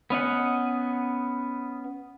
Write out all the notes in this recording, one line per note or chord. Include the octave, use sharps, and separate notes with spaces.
B3 C#4 D#5 F#5